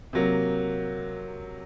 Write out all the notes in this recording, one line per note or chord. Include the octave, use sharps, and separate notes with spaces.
C3 F#3 A#3